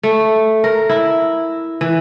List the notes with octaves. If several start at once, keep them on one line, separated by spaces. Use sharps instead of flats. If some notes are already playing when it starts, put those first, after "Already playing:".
A3
A#4
E4
E3